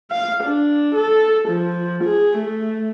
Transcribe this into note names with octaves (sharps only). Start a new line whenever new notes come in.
F5
D4
A4
F3
G#4
A3